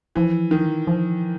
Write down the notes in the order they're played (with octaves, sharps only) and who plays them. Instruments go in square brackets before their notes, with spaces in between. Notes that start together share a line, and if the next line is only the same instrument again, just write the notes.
[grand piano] E3 [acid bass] F3
[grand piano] D#3
[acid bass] F3